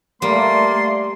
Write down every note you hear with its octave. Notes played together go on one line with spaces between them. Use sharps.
G3 A3 A#3 D5 C6